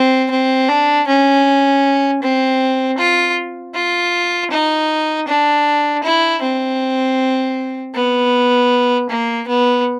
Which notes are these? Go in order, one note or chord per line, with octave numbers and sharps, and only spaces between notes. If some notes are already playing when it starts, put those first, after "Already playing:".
Already playing: C4
C4
D4
C#4
C4
F4
F4
D#4
D4
E4
C4
B3
A#3
B3